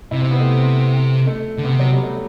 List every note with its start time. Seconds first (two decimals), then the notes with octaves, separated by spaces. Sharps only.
0.11 C3 E4
0.22 C4
0.31 B3
0.40 A3
1.27 A3
1.58 D3
1.64 C3 B3
1.80 F#3
1.92 G3
2.03 A3